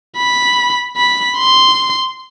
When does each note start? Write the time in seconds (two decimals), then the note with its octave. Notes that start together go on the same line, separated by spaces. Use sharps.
0.17 B5
0.97 B5
1.37 C6